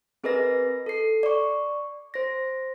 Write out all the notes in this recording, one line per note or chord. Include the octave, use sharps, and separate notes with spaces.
C4 G#4 A#4 B4 D#5 A#6
A4 C7
D5 C#6
C5 A#6